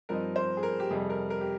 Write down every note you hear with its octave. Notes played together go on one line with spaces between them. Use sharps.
G2 F3 C4 D#4 A#4
C5
G#4
A#4
G4
F2 C3 G3 G#4
A#4
A#4
G4